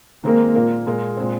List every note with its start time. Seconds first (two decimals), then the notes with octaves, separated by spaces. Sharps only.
0.24 D#3 G#3 A#3 C4 D#4 A#4
0.55 A#2 A#3 F4 A#4
0.87 A#2 G#3 F4 A#4
1.17 A#2 G#3 C4